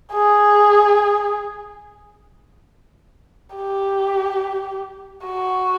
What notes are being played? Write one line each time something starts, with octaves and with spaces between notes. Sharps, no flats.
G#4
G4
F#4